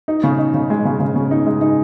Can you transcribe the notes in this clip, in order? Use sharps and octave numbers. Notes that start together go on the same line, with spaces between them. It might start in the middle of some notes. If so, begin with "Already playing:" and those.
D#4
C#3
D#4
C#3
G#3
C#3
C#3
C#3
D#4
G#3
D#4